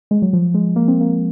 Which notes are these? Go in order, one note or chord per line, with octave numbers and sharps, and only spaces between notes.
G#3
F#3
F3
G#3
A#3
C4
A#3